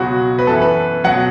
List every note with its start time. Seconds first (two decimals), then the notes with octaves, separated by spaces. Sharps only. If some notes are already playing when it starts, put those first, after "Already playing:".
Already playing: C#2 B2 F#3 F#4
0.39 B4
0.47 F#2 A4
0.51 E3
0.62 B4
1.04 B2 F#3 F#5